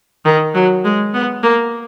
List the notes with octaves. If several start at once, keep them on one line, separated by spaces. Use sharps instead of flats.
D#3
F#3
G#3
B3
A#3